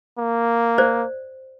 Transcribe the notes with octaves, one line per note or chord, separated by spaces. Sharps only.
A#3
C5 D5